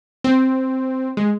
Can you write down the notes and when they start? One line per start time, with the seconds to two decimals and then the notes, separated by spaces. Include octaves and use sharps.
0.24 C4
1.17 G#3